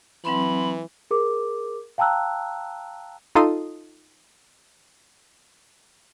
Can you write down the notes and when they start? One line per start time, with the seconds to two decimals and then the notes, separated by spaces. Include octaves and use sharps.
0.25 E3 F#3 C4 B5 C6
1.11 G#4 A#4 D6
1.98 F5 G5 A5 A#5 E6 F#6
3.35 D#4 F4 A4 C6 D#6